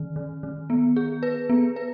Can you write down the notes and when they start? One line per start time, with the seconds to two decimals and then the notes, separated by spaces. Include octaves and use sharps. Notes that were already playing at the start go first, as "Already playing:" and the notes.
Already playing: D#3
0.16 D#3
0.43 D#3
0.70 B3
0.96 G#4
1.23 B4
1.49 B3
1.76 B4